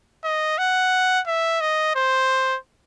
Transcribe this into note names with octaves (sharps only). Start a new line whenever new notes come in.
D#5
F#5
E5
D#5
C5